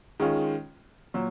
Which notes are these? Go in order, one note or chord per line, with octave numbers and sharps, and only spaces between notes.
D#3 G#3 C#4 F4
A#2 F#3